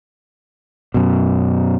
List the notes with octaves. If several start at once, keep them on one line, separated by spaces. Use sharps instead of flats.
F#2 B2